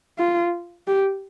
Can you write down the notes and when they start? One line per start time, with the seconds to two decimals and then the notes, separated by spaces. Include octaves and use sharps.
0.19 F4
0.87 G4